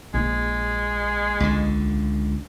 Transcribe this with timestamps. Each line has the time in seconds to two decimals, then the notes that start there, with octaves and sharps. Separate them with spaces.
0.14 A#1 G#3 A#3
1.40 C#2 D3